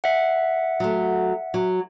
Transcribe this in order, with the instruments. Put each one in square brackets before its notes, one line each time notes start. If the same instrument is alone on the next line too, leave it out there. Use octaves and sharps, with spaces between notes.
[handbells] E5 F#5
[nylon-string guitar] F#3 A3
F#3